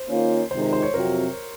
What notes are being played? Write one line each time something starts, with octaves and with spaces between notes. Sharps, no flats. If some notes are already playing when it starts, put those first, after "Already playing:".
Already playing: C5
D#3 A#3 C#4 F4
F2 C3 D#3 G#3 D#4 C5
C5
C5
C#5
F2 C3 F#3 C4 F#4 A#4